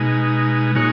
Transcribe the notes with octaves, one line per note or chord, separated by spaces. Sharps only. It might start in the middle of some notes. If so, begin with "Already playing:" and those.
Already playing: B2 G#3 D#4
A#2 G#3 D#4 F#4 C#5